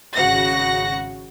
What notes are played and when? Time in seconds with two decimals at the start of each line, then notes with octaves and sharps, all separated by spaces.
0.15 G#1 C#3 F#4 F#5 A#6